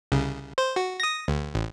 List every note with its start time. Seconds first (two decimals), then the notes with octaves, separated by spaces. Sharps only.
0.12 C2 C#3
0.58 C5
0.76 F#4
1.00 D#6 A#6
1.28 D2
1.55 A1